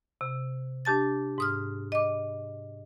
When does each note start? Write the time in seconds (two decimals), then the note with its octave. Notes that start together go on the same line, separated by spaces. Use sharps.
0.21 C3
0.85 D4 G4 A5 A6
1.38 G#2 D#6 F6
1.92 D#5 D6